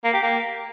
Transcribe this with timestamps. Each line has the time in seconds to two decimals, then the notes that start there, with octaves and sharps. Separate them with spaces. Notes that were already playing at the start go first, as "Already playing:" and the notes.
0.04 A#3
0.13 G4
0.23 A#3